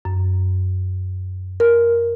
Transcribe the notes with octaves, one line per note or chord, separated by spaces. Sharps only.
F#2
A#4